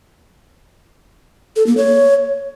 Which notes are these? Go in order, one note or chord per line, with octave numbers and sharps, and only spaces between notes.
A4
A#3
C#5